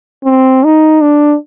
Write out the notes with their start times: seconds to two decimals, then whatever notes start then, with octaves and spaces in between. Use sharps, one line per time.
0.24 C4
0.64 D#4
1.01 D4